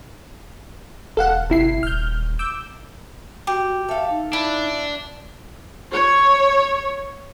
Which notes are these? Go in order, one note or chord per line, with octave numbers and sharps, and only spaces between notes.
E1 A4 F5 F#5
G1 C3 E4 C7
D#1 F6 G6
D6 E6 G6
F#4 G4
A4 E5 F5
D#4
D4 E4
C#5